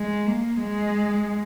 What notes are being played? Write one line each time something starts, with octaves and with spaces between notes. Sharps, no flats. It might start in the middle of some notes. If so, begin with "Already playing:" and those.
Already playing: G#3
A#3
G#3